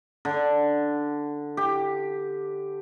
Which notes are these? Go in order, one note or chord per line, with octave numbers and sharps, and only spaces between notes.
D3
G4